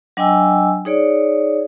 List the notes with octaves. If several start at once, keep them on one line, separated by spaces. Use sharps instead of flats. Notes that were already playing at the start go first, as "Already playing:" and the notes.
F#3 D4 D#5 G5 G#5 E6
D#4 G#4 C#5 D5